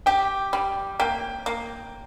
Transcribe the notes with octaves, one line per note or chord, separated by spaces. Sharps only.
G4 G5
G3
A#3 G5
A#3